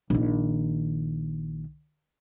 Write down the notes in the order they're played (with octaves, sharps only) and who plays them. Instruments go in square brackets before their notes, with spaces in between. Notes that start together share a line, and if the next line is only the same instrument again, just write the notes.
[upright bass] A#1 D#3